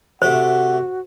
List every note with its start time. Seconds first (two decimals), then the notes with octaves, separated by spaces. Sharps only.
0.22 C3 A3 F#4 A4 C5 F#5